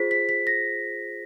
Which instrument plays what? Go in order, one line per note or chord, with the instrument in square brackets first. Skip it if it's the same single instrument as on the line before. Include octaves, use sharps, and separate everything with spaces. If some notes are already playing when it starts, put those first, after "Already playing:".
Already playing: [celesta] F4 G#4 C5 B6
B6
B6
A#6